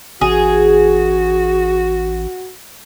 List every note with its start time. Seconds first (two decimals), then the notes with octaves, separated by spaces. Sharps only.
0.21 A1 F#4 G#4